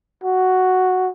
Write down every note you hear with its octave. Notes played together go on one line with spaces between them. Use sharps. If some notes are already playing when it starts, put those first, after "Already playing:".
F#4